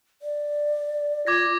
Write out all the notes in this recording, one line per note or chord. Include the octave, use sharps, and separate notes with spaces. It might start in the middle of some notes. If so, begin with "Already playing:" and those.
D5
F4 D6 G#6 A#6